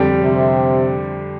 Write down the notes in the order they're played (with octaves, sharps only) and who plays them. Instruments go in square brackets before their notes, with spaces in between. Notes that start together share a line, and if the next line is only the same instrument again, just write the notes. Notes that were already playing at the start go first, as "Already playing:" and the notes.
Already playing: [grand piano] F2 D3 G3 D4 G4
[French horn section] C3